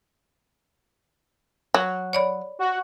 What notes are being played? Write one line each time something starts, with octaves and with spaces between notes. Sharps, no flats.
F#3
C#5 D5 B5
F#4